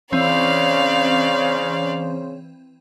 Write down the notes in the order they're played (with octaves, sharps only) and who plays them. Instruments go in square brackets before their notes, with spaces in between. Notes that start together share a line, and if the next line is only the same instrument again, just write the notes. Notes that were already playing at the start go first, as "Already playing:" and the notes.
[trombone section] C#3 C#4 C5 [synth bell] E3 C4 [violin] D5 F5